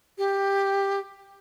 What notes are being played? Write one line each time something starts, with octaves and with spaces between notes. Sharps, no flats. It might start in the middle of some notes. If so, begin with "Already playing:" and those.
G4